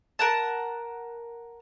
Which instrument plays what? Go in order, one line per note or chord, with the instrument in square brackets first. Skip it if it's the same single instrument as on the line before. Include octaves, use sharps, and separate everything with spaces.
[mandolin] A#4 F#5 A5